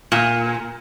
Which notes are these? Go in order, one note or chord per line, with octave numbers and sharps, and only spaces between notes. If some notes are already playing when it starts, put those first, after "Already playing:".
A#2